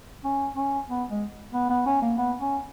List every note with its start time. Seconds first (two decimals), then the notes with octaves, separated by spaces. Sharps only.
0.24 C#4
0.56 C#4
0.88 B3
1.10 G#3
1.53 B3
1.70 B3
1.86 C#4
2.02 A#3
2.18 B3
2.41 C#4